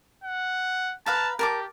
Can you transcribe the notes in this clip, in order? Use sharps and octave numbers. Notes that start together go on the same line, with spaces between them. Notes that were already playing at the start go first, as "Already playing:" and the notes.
F#5
B4 F5 A5 A#5
G4 A#4 A5 D6